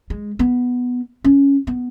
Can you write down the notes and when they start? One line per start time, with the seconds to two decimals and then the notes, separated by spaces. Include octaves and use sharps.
0.10 G#3
0.39 B3
1.24 C#4
1.67 B3